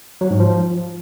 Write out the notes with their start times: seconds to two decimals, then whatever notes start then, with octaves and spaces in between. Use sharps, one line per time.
0.21 F#3
0.30 G#2
0.40 F3